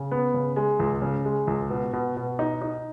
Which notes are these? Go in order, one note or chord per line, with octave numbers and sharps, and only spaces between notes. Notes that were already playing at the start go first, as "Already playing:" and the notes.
Already playing: C#3
B3
C#3
G#3
C#2
C#3
G#3
C#2
B2
B2
B2
D#4
D#4